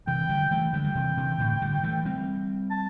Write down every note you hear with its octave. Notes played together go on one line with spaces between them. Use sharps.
C3 E3 G5
D3 G3
E3 A3
D3 G3 G5
G3
C3 E3
C3 E3
A2 D3
D3 G3
E3 A3
G3 C4
A5